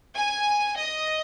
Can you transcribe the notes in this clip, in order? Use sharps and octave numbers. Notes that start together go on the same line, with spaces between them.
G#5
D#5